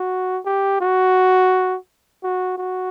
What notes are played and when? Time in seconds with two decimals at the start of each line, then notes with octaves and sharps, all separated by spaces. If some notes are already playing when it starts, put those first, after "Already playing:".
Already playing: F#4
0.46 G4
0.81 F#4
2.24 F#4
2.58 F#4